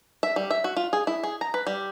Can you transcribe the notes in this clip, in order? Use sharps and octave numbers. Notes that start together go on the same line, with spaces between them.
E5
G3
E5
F#4
F4
G#4
E4
G#4
A#5
B4
G3